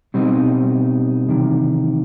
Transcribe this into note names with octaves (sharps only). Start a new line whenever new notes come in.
B2 G3 C4 D#4
E2 C3 D#3